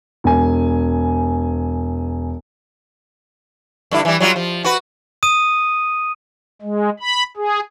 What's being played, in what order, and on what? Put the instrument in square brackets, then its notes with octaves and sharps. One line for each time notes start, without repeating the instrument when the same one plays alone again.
[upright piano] E1 G#5
[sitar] G2 D3 E4
E3 G3
F#3 G3 F4
F3
F#4 B4
[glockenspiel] D#6 D#7
[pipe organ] G#3
B5
G#4